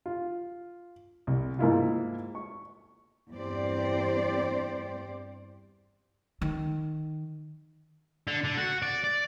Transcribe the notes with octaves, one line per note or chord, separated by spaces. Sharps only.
F4
C2
G#2 A#3 E4 F4
C#6
E2 G2 C4 G4 C5 D5
D#3
D3
D3
F#4
D5
D5